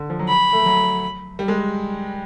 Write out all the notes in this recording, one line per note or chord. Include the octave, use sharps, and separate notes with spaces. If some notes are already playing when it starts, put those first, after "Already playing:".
Already playing: D3
F3
F#3
B5
A3
F#3
G3
G#3